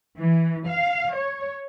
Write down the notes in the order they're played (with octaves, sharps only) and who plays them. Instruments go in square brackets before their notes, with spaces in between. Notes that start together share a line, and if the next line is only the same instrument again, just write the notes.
[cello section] E3
F5
C#5